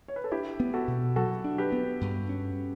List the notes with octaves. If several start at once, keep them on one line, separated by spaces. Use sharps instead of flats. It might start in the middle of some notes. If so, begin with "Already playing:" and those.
C#5
B4
A4
D4 E4 G4
B3
F#4 A4
B2
F#3 F#4 A4
D4
G4 B4
B3
G2
C#4